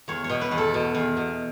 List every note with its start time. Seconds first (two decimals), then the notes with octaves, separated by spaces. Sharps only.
0.08 E2 C#5
0.24 C#5
0.29 B2
0.41 B4
0.51 E2
0.58 A4
0.74 B2
0.95 E2
1.17 B2